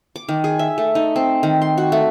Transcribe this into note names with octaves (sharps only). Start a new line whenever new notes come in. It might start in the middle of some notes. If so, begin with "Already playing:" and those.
D6
D#3
G#4
E5
A3
D#4
C4
D#3
C6
F#4
A3